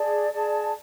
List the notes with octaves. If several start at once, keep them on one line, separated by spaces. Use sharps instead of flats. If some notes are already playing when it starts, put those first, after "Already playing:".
Already playing: G#4 D5 A5
G#4 D5 A5